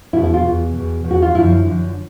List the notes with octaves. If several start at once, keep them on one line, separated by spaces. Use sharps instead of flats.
E2 B2 E4
E4
F4
E2 B2
E2 B2
E2 B2
F#4
F4
F#2 D3 F3 E4
F#2 D3 F3